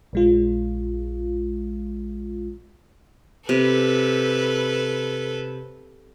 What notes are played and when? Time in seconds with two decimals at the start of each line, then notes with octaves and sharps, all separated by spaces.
0.13 A#1 G#3 F4
3.49 C3 A4 B4